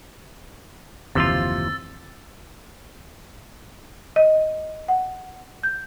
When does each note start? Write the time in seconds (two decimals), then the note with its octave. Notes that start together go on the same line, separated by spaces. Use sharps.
1.15 F#1 D#2 C3 E3 F3 F4 E6 A6
4.16 D#5
4.88 F#5
5.63 G6